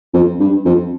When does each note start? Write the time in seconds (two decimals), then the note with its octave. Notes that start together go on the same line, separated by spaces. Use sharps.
0.14 F2
0.40 G2
0.65 F2